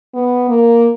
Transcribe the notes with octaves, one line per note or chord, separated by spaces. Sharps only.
B3
A#3